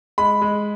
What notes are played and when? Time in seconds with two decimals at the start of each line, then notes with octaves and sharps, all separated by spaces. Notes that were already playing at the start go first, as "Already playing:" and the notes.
0.18 G#3 B5
0.42 G#3